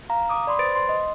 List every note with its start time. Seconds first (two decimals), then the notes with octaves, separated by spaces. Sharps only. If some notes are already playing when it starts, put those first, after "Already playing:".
0.10 F5 A#5
0.29 D6 D#6
0.47 D5 B5 C6
0.59 B4 C5 A6 D7
0.75 C6
0.89 D#5